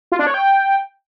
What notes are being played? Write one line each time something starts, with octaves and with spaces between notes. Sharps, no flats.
F4
D4
C#5
G5